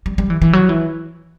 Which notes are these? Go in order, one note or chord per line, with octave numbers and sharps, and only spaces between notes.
G3
G3
E3
E3
F#3
E3